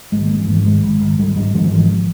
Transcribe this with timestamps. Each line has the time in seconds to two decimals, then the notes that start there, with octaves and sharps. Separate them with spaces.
0.12 G#1 G#3
0.26 G#2 A#3
0.39 E3
0.48 G#2 F3
0.65 G#1 G#3
0.83 G#1
1.01 G#1
1.18 G#1 G3
1.36 G#2 G3
1.54 G#2 F3
1.64 E3
1.72 G#1 F3